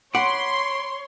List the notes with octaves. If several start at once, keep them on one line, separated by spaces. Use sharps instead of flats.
C#5 F#5 B5 C6 D6